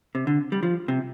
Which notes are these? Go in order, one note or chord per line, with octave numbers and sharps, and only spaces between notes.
C3
D3
G3
F3
C3